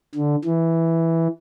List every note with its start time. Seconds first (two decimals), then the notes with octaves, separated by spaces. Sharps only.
0.15 D3
0.45 E3